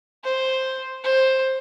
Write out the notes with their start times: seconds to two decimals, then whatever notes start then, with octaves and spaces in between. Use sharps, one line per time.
0.24 C5
1.04 C5